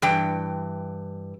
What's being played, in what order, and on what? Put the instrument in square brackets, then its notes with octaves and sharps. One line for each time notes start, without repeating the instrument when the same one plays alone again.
[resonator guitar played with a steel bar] G2 E3 G5